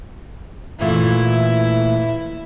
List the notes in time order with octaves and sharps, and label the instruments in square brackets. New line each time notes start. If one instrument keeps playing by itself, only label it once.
[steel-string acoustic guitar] A#2 E3 A3 [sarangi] E4